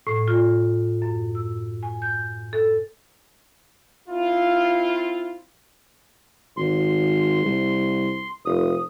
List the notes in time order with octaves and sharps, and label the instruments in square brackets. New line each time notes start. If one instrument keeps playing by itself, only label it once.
[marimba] A2
F4
F#2
E6
G#5
G6
A4
[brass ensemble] C4 E4 F4
[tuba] G#1 [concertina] C6
[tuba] C2
[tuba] F1 [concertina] D#6